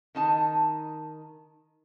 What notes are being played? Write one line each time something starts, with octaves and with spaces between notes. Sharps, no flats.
D#3 D#4 A5